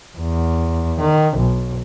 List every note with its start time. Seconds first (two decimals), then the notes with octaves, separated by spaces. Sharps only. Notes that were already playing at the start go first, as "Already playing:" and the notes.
0.18 E2
1.00 D#3
1.37 B1